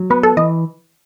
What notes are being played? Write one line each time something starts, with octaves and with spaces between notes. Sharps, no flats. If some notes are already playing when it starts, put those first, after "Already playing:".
Already playing: F#3
B3 B4
A4
E3 D#5